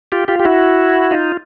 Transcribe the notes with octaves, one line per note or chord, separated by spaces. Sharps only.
F4 G4
F4 G4
G4
E4 F#4
D#4 F4